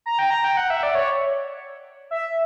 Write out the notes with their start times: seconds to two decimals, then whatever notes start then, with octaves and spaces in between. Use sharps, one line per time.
0.06 A#5
0.19 G5
0.30 A#5
0.44 G5
0.57 F#5
0.70 E5
0.83 D5
0.95 C#5
2.11 E5